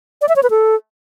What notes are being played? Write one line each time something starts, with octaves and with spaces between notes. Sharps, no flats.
D5
E5
C#5
B4
A4